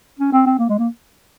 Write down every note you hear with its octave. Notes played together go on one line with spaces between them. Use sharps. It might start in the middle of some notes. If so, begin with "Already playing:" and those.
C#4
C4
C4
A#3
G#3
A#3